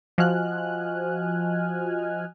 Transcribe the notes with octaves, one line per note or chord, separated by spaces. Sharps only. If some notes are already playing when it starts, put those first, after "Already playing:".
F3 F#4 D#5 G#5 F6 F#6